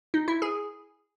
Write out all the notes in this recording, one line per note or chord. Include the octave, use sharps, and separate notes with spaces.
D#4
E4
G#4